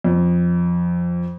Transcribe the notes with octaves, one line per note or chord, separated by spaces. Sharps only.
F2